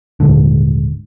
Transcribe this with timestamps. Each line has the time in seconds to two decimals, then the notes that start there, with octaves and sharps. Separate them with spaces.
0.20 D#1 A#1 G#2 D3